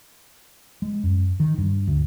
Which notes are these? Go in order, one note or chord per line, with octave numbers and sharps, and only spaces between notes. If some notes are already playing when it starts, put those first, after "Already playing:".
G#3
F#2
D#3
G2
D2